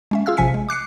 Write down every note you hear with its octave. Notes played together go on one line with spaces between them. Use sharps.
G#3 C#4 E5
F4 G#4 F5 E6 F6
A1 C3 F3 G#5 B6 C#7
G#3
D6 F#6 C7 C#7